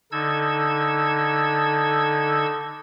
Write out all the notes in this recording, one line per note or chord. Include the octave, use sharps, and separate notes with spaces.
D3 D#4 A4 E6 G#6